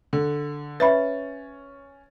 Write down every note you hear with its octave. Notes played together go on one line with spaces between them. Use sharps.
D3
C#4 B4 E5 B5 A6